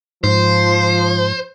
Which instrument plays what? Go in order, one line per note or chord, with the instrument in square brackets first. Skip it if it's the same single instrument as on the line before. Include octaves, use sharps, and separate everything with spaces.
[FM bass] G#2 [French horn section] F3 [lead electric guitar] C5